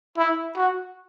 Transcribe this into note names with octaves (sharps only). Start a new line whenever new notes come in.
E4
F#4